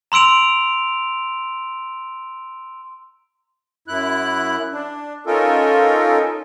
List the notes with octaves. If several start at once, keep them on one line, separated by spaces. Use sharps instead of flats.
A#5 C6 E6 D7 F7
F#2 E4 F#6
D4
C#4 D#4 F4 A4 A#4